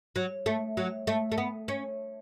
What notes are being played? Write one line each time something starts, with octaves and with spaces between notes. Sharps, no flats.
F#3
A3
F#3
A3
A3
B3
C#4